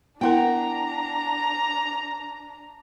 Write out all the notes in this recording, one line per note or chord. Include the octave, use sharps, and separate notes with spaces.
B3 D4 E4 A#4 F#5 G5 A#5